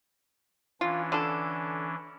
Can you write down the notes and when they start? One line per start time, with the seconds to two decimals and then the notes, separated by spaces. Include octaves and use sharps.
0.81 E3 C#4 D4 F4
1.12 D3 A4